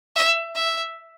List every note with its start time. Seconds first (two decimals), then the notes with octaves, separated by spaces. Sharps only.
0.15 E5
0.55 E5